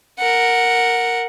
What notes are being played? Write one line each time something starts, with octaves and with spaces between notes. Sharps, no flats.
A#4 F#5